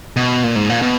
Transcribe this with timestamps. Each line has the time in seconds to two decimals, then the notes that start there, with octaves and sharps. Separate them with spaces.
0.17 B2
0.43 A#2
0.56 G#2
0.69 A#2
0.82 B2